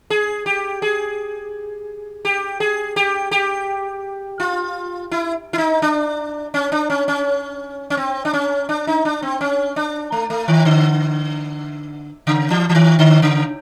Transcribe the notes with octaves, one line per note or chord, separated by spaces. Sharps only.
G#4
G4
G#4
G4
G#4
G4
G4
F4
E4
E4
D#4
D4
C#4
D4
C#4
C#4
C#4
C4
D4
C#4
D4
D#4
D4
C4
C#4
D4
A3
A3
D#3
D3
C#3
E3
E3
D#3
D3
C#3